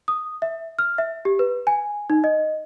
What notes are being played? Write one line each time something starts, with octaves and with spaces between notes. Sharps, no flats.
D#6
E5
F6
E5
G4
B4
G#5
D#4
D#5